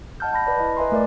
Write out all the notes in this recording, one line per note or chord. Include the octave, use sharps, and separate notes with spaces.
D#5 F#5 A5 F6 G6
A5 B5 A#6
B4 D5 B5
E4 D#5
B4 D#5 E5 G#5 A#5 C6
A3 A#4 D5